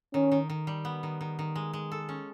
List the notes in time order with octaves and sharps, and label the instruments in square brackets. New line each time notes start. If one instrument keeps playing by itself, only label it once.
[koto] D#3 [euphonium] C#4
[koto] D#3
D#3
G3
B3
D#3
D#3
D#3
G#3
G#3
A4
C#4